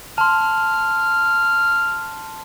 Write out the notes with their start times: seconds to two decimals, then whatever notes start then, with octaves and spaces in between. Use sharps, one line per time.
0.18 A5 C6 F6